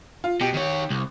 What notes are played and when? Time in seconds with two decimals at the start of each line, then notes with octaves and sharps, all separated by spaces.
0.24 F4
0.41 B2 G4
0.54 D#3 C#5
0.90 C2